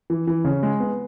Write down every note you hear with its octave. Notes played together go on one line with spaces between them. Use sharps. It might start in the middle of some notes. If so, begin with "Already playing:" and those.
E3
E3
C#3
G#3
B3